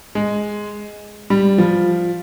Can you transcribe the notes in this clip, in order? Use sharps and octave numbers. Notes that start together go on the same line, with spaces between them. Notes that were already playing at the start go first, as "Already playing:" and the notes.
G#3
G3
F3